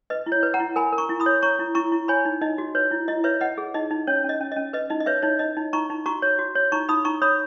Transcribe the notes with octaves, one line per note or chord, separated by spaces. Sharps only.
B4 D#5
E4
C#5
B4
F#5 A#5
E4
A#4 G#5 B5
A#4
A#5 C#6
E4
B5 D#6
C#5
C#5 A#5 C#6
E4
E4 A#5 C#6
E4
C#5 G#5 B5
D#4
D#4 D#5
F#4
B4 C#5
E4
E4 D#5
B4 C#5 E5
B4 D#5 F#5
G#4
D#4 D#5
D#4
C#4 C#5
C#4
D#5
C#4
C#4 D#5
B4 D#5
D#4 D#5
D#5
B4 C#5 E5
D#4 C#5
D#4 D#5
D#4
D#4 A#5 C#6
D#4
F#4 A#5 C#6
C#5
F#4
C#5
D#4 A#5 C#6
D#4 B5 D#6
D#4 A#5 C#6
C#5 B5 D#6